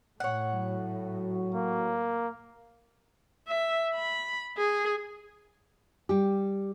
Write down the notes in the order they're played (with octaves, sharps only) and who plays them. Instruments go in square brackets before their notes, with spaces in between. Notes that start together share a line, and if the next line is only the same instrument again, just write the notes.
[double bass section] A2 [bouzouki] C#5 F#5
[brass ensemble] F#3 F#4
[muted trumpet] A#3
[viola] E5
B5
G#4
[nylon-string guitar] G3 G4